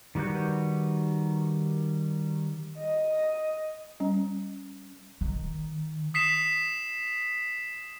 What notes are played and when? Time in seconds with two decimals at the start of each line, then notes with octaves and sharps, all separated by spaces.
0.15 D#3 G3 F#4 B4 G6
2.79 D#5
4.00 G3 C#4
5.21 D#3
6.14 D#6 B6 C7 E7